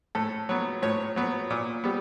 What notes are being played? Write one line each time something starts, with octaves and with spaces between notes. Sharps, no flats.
A2 A4
F#3 B3
A2 C#5
F#3 B3
A#2
G3 B3